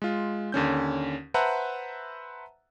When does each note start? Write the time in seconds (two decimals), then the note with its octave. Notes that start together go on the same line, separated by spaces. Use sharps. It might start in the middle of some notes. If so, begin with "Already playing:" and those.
0.02 G#3 F4
0.52 D#2 D3 C#4 G6
1.34 B4 C5 E5 F#5 A5 A#5